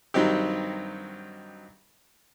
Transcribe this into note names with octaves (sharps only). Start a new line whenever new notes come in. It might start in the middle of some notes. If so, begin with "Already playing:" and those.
G2 D#3 F#3 C4 D#4 G4